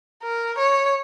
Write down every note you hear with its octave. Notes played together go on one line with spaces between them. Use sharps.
A#4
C#5